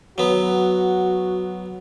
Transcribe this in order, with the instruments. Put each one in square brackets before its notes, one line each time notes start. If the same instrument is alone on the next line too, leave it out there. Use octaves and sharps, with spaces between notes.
[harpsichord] F#3 B3 [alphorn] F#4